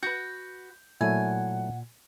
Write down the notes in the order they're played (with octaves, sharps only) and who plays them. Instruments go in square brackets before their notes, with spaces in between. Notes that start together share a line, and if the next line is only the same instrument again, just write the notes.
[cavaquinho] F#4 B4 [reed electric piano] G6
[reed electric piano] A#2 [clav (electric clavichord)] F#3 A3 E4 [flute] F#5 [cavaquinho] G#5